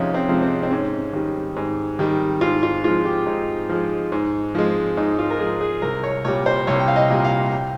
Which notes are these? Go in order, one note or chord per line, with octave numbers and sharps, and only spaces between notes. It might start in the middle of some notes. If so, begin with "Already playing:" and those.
Already playing: F2 C3 F3 G#3 C#4 D#4
C4
C3 F3 G#3
C4
C4
G#2 C#4
D#3 G3
G#2
D#3 G3
G#2 F4
F4
F3 G#3 F4
G4
G#2 D#4
F3 G#3
G#2
F3 G#3
G#2 D#4
F4
A#4
F3 G#3 G#4
G#4
C2 A#4
C#5
A#2 G3 C#5
C5
C2 C#5
G5
F5
D#5
A#2 G3
F5
G5